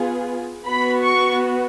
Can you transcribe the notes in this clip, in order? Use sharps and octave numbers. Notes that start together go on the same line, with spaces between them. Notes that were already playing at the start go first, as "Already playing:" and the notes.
Already playing: B3 F4 G#4
B3 F#4 B5
C#6